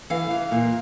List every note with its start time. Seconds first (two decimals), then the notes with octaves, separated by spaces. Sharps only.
0.10 E3 F5
0.30 E3 F5
0.51 A#2